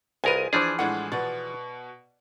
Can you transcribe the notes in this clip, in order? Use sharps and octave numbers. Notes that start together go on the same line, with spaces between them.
C2 F4 G#4 A#4 B4 G#5 D#7
E3 F3 D4 G#4 C5 D5
A2 G#3 D4 F#5
B2 B3 D5